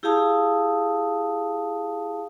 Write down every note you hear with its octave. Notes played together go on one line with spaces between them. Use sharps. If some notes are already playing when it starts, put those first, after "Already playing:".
E4 G4 G#4 F5 A5 D#6